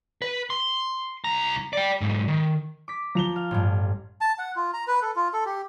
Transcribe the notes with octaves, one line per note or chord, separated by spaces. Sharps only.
B4
C6
C2 A#5
D5 G5
B1 G#2
D#3
D6 B6
F3 A#5 F7 G7
F5
A1 G2
A5
F#5
F4
A#5
B4
A4
F4
A4
G4